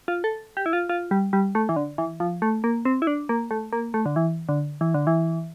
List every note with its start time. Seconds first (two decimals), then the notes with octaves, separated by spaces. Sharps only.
0.08 F4
0.24 A4
0.57 G4
0.66 E4
0.73 F4
0.89 F4
1.11 G3
1.33 G3
1.55 A3
1.69 E3
1.76 D3
1.98 E3
2.20 F3
2.42 A3
2.64 A#3
2.85 C4
3.02 E4
3.07 D4
3.29 A#3
3.51 A3
3.73 A#3
3.94 A3
4.06 D3
4.16 E3
4.49 D3
4.81 E3
4.94 D3
5.07 E3